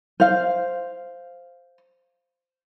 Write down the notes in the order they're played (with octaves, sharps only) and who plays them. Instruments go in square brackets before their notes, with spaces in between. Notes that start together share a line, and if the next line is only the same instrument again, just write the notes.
[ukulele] C5 F5